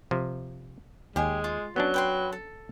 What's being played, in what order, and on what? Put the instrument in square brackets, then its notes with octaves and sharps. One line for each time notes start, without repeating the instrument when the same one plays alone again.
[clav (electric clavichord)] C3 F3
[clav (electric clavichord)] D#2 [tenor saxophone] G#3 [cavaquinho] G4 G#4
[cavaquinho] F4
[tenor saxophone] F#3 [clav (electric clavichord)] B3 C#4 D4
[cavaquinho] B4 G5 C6
A4